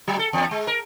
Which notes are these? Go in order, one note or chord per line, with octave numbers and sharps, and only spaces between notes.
F#3
A4
E2
G#3
A#4